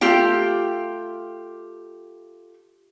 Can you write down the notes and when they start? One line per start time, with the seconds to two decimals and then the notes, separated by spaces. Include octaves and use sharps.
0.01 A3 F4 G4 G5